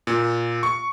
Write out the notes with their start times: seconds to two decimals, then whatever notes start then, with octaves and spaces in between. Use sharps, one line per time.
0.07 A#2
0.63 C#6